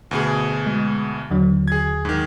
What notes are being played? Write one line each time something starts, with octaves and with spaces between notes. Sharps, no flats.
D2 B2 G#4
G#3
D#2 D3 F#3
G#4 G#6
G#2 D#3